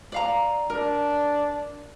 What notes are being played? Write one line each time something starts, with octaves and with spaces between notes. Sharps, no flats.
D5 F5 A#5
D4 A#4